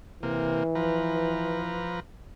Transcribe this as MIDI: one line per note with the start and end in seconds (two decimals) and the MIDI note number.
0.23 0.64 48
0.23 1.99 52
0.23 0.64 58
0.75 2.00 53
0.75 2.00 71
0.75 2.00 82